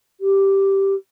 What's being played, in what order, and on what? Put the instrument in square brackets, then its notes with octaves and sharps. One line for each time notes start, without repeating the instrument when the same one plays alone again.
[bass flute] G4